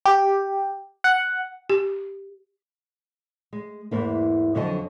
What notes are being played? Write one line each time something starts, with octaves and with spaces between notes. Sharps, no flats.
G4
F#5
G4
G#3
E2 G#2 A#3 E4
F2 D3 F#3 D#5 G#5